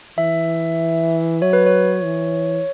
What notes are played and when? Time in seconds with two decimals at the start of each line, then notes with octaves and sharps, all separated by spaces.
0.18 E3 E5
1.42 F#3 C#5
1.53 B4
1.66 C#5
2.04 E3